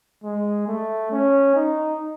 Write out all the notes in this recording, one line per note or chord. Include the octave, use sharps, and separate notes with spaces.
G#3
A3
C#4
D#4